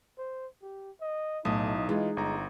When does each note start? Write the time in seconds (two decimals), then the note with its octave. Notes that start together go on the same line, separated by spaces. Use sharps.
0.18 C5
0.62 G4
1.01 D#5
1.45 B1 A2 D#4 D#6
1.89 E3 G#3 F4
2.17 G1 A#5